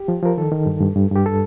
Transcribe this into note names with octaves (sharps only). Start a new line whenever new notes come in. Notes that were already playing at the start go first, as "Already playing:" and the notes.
Already playing: G4
F3
F3 A#4
D#3 A4
D#3
G2
G2
G2
G2 G4
A4